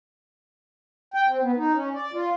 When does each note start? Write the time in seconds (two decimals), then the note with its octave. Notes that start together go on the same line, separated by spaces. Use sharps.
1.14 G5
1.27 C4
1.41 B3
1.56 D#4
1.74 C#4
1.94 D5
2.13 F4